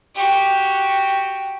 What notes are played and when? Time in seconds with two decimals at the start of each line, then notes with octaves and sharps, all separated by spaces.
0.15 F#4 G4